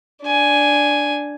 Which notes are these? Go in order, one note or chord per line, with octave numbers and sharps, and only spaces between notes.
D4 G#5